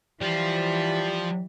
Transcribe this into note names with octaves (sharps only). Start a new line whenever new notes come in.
E3 F3 G3 F4